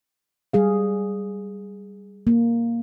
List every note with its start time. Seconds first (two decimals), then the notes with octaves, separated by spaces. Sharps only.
0.53 G3 G#4 F5
2.27 A#3